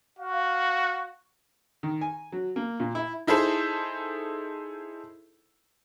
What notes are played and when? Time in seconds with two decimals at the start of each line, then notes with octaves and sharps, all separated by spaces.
0.19 F#4 F5
1.83 D#3
2.01 G#5
2.32 F#3
2.56 A#3
2.80 A#2
2.95 E4
3.27 D#4 E4 G#4 A4 C5